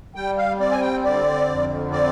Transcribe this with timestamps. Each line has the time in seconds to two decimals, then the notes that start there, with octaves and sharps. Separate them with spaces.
0.15 G3 G5
0.37 F5
0.59 C4 D5
0.71 G#5
0.81 G5
1.03 D3 D5
1.47 F2
1.91 C4 D5